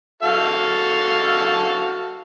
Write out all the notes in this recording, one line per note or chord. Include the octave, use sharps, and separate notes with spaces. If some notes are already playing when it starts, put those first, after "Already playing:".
F#4 A4 F5